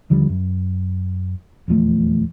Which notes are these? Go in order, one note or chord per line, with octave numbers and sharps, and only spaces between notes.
D#2 D3 F3 G3
F#2
D#1 E2 F3 A3